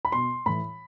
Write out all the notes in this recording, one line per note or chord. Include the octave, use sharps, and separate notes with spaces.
B5
B2 C6
A2 E3 B5